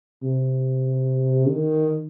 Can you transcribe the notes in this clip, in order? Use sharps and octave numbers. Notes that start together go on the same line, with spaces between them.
C3
D#3